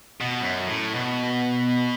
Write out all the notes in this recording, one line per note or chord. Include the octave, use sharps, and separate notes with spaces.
B2
F#2
A2
B2